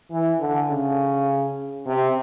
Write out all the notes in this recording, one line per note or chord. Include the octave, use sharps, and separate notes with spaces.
E3
D3
C#3
C3